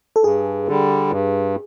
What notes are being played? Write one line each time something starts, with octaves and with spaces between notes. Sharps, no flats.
A4
G2 G#4
D3 G3
G2